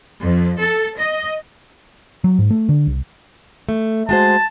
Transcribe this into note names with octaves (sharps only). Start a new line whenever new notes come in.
F2
A4
D#5
F#3
G#2
A3
D3
C2
A3
G#3 F#4 C5 A5